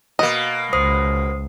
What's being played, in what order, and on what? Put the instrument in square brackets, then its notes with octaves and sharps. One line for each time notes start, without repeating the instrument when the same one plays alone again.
[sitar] B2 A#3 [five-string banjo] D#5
[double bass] C#2 [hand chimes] C5 D#6 C7